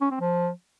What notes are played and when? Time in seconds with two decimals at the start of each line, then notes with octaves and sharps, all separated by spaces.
0.01 C#4
0.10 C4
0.20 F3